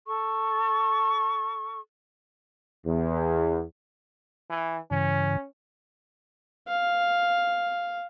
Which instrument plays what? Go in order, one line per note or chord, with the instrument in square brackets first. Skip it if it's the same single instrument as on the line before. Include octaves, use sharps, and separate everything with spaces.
[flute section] A4 C#6
[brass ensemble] E2
[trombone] E3
[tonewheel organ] G2 C#3 E3 [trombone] C#4
[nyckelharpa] F5